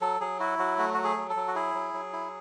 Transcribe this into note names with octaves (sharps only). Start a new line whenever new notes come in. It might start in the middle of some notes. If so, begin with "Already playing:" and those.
F#3 A4
F#3 G#4
E4 F#4
F#3 F#4
A3 F#4
F#3 F#4
G#4
F#3
A4
F#3
F#4
E4 G#4
F#3
F#3
E4